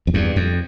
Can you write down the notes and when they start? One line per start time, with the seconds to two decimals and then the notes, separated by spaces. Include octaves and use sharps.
0.07 F2
0.14 E2 G2
0.36 F2